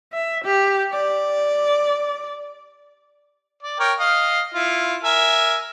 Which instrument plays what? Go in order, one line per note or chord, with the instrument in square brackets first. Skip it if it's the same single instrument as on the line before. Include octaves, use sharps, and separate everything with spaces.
[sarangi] E5
G4
D5
[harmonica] D5
A#4 C#5 G5
D#5 F5
E4 F4
A#4 E5 G#5